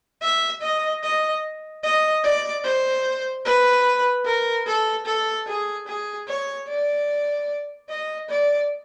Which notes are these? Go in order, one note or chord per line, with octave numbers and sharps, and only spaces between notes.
E5
D#5
D#5
D#5
D5
C5
B4
A#4
A4
A4
G#4
G#4
C#5
D5
D#5
D5